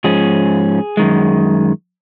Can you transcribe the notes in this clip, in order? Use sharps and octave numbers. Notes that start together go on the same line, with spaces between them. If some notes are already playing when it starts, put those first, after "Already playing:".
G#2 F3 C#4 G#4
F#2 D#3 G#3